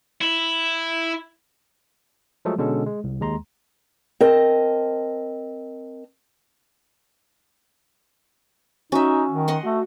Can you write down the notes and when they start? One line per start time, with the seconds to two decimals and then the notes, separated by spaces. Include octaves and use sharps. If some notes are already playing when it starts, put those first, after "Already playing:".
0.21 E4
2.45 F3 F#3 G#3 A3 G#4 A4
2.58 B2 D3 G#3 C#4 A4
2.87 G#3
3.04 C2
3.21 D#2 G#3 A#5 C6
4.21 C4 A#4 D#5 A5
8.92 C#4 D#4 F#4 E5
9.30 D#3
9.48 D#5 F#5 C6
9.63 A3 F#4